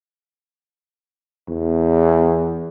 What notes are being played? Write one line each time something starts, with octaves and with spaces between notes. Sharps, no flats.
E2